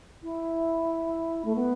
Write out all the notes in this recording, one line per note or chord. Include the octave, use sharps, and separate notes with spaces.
E4
A3
B3